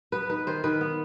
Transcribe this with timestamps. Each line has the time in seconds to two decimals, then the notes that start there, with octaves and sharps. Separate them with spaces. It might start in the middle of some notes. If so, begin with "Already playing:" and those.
0.12 B3 B4
0.30 D#4 B4
0.47 D#3 C5
0.64 D#3 B4
0.81 B3